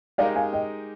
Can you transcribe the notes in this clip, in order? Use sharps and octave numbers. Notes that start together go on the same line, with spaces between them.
G#3 D#4 G4 A#4 D5 F5
F5 G#5
D#5 G5